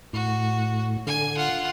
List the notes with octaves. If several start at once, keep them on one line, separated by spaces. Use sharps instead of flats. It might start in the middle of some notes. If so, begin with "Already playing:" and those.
A2 F#4
D3 G#5
F4 F#5